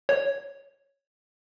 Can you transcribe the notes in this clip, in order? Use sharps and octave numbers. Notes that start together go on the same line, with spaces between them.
C#5